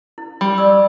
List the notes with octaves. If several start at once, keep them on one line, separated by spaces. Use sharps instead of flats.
E4
G3
D5 E6